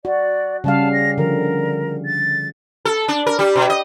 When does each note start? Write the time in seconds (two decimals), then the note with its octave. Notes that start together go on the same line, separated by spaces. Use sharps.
0.05 F#4 D5
0.64 C#3 G3 F5 A5
0.93 A#6
1.18 D3 F3 A#4
2.06 A6
2.85 A4
3.08 D4
3.26 A#4
3.39 G3
3.55 B2
3.70 D#5